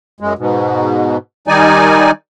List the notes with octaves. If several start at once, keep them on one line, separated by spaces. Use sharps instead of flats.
F#2 G#3
G#2 B2
D#3 G3 D#4 D5 G#5